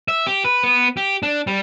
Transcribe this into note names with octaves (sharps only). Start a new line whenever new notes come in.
E5
G4
B4
B3
G4
D4
G3